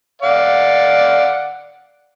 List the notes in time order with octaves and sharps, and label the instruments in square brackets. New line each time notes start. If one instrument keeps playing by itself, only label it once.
[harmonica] D5 F5 F#5